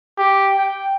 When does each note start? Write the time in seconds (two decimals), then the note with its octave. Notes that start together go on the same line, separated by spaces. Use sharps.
0.18 G4
0.58 G5